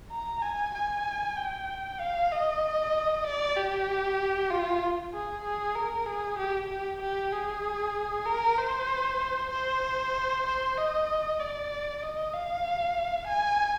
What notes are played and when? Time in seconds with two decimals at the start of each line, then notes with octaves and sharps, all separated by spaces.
0.11 A#5
0.42 G#5
0.74 G#5
1.37 G5
2.00 F5
2.32 D#5
3.25 D5
3.56 G4
4.51 F4
5.13 G#4
5.44 G#4
5.76 A#4
6.07 G#4
6.38 G4
6.70 G4
7.02 G4
7.33 G#4
8.26 A#4
8.58 C5
9.51 C5
10.46 C5
10.77 D#5
11.40 D5
12.03 D#5
12.34 F5
13.27 G#5